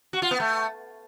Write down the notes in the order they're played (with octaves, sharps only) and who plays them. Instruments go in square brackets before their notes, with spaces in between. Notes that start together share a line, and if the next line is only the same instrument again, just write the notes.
[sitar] F#4
F4
B3
A3